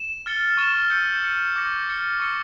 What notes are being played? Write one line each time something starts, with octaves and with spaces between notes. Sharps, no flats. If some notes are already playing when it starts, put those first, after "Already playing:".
Already playing: E7
F6 A6 C#7 G7
C#6 F6 A6 E7 G7
E6 G6 C#7
G6 C#7 G7
D6 G6 A#6 C#7
F6 A6 C#7 G7
C#6 E6 A6 C#7 G7